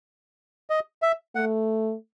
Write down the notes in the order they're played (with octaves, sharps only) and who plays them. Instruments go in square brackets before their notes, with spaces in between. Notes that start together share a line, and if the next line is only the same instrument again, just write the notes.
[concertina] D#5
E5
[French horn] A3 [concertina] F#5